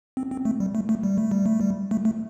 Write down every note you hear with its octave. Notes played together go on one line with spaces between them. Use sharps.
C4
C4
A3
G3
A3
A3
G3
A3
G3
A3
G3
A3
A3